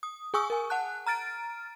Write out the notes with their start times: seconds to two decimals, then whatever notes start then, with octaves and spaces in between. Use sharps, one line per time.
0.03 D#6
0.34 G#4 G#5 C#6 D#6 E6
0.50 A#4 G#5
0.70 F#5 A5 F#6
1.06 A#5 F6 A6 D7